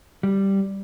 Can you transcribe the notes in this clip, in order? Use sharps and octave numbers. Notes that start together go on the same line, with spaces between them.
G3